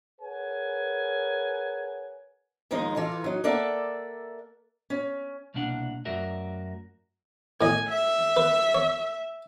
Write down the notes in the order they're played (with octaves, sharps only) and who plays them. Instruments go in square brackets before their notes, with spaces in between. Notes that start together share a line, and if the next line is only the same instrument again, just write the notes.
[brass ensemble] G#4 A#4 B4 C#5 F#5 G#5
[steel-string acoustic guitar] D#2 F3 G#3 D#4 D#5
E3 F4 A4
F#3 D#4
A#3 A4 D5 E5 F#5
C#4
[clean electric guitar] C2 B2 A#3 D4 F#5
F#2 A3 F#4 A#4 D5 E5
[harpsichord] A2 D#5 [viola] G#5
[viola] E5
[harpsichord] B4
C#5